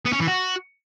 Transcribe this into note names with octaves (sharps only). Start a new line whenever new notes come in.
B3
C#4
E3
F#4